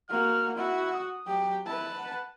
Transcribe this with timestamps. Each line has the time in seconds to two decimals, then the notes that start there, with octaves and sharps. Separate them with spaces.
0.10 A#3 F#4 F6
0.56 E4 F#4
0.94 D#6
1.26 F#3 G4
1.66 E4 B4 A5
1.98 F#5